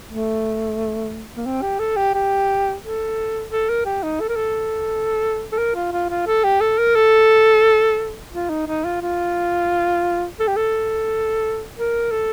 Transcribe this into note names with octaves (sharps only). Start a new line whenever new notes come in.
A3
A#3
C4
G4
A4
G4
G4
A4
A4
A#4
G4
D#4
A4
A#4
A4
A4
A#4
F4
F4
F4
A4
G4
A4
A#4
A4
F4
D#4
D#4
F4
F4
A4
G4
A4
A#4
A4